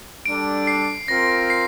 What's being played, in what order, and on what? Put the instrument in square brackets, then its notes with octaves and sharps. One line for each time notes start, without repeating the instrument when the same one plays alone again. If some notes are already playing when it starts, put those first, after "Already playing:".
[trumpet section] G3 D4 A4 [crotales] D7
[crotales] C7
[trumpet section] C4 F4 A#4 [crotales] A#6
[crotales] C7